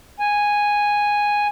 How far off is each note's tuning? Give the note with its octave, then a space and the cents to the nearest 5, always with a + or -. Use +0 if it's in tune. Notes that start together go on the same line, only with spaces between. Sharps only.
G#5 -5